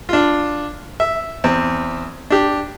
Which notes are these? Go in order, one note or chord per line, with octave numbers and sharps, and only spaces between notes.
D4 F4
E5
E2 C4
D4 G4